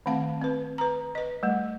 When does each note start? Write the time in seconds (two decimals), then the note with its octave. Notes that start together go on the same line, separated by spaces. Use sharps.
0.06 D#3 A3 C4 F5 A5
0.42 C4 B4
0.78 B4 A#5
1.15 B4 D#5
1.43 G3 A3